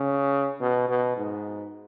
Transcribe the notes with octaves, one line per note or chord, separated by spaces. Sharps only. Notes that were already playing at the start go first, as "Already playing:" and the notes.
Already playing: C#3
B2
B2
G#2